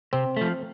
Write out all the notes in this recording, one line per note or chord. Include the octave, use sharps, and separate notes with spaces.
C3 C4
F3 A3